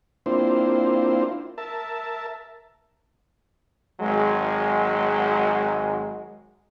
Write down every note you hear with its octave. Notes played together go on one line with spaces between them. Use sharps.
A#3 C4 D4 E4 F4 C5
A#4 E5 A5
G#1 F#3 G#3